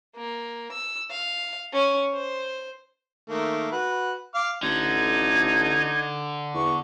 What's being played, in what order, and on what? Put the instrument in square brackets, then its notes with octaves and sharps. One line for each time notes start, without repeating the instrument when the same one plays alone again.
[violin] A#3
E6
F5
C#4
C5
[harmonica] D#3 A3 A#3
F#4 B4
F5 D6 F6
[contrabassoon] A1 [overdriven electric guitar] D3 [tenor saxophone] D#4 [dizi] G#6
[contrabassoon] E2 [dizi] C#6